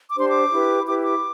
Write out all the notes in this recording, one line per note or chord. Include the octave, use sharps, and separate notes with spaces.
D6
D4 G4 C5 C6
D6
E4 G4 B4
E4 G4 B4 D6
D6